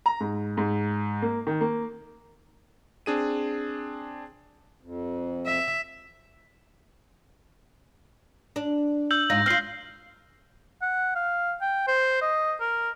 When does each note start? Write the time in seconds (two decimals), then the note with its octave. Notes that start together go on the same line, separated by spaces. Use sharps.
0.06 A#5
0.20 G#2
0.57 G#2
1.22 A#3
1.47 D#3
1.61 A#3
3.06 C4 D4 G#4 D#7
4.82 F2
5.46 E5
8.56 D4
9.11 E6 G6 F#7
9.30 G#2 D#4 F4 A#6
9.46 C4 F4 F6 C7
10.82 F#5
11.15 F5
11.61 G5
11.87 C5
12.22 D#5
12.60 A#4